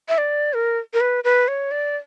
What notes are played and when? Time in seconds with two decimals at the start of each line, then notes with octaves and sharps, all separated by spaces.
0.09 E5
0.18 D5
0.54 A#4
0.94 A#4
1.01 B4
1.24 B4
1.48 C#5
1.71 D5